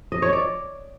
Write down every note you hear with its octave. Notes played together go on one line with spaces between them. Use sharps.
D#5
C#5
D5